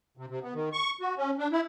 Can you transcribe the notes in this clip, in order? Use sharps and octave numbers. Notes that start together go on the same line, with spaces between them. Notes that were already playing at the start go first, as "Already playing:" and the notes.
C3
C3
B3
D#3
C#6
F#4
C#4
D4
E4